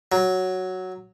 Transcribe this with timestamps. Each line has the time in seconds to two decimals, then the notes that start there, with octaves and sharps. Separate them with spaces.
0.12 F#3